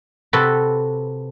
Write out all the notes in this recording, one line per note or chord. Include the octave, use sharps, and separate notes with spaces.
C3 F#4 A4 B4